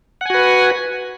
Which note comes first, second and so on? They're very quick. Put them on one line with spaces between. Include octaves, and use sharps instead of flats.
F#5 G#5 F#4 B4